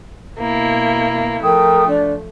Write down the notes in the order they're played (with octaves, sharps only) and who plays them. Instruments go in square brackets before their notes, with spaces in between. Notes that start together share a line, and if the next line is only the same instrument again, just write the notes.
[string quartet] B2 A#3 E4
[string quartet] F3 A3 [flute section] A#4 G5 D#6
[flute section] D4